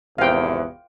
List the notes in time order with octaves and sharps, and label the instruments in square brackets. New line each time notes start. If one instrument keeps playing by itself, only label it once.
[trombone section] G#1 E2 C3 [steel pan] F5 G5